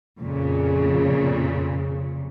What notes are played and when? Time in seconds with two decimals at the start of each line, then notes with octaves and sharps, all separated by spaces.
0.21 F2 A#2 C#3